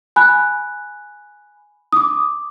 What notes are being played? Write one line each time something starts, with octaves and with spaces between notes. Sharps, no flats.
G#5 B5 F#6
D6 D#6